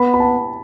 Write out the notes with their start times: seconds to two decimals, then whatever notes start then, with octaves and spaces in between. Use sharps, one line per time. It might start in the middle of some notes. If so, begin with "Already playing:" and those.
Already playing: B3 B5
0.14 B5
0.20 A5